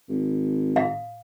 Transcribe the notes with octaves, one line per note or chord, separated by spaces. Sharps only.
G#1
F5